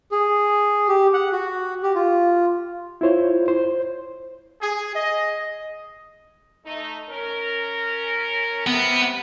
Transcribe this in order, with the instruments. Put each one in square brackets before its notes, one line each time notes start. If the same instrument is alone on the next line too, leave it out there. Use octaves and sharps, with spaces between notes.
[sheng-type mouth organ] G#4
G4
F#5
F#4
G4
F4
[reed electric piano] E4 F4 C5 C#5
C5
[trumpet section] G#4
D#5
[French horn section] A3 D#4
C#4 A#4
[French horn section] C3 [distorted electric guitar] B3